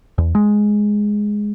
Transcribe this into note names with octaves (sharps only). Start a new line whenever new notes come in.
E2
G#3